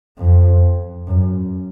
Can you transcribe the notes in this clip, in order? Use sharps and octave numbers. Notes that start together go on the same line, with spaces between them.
F2
F#2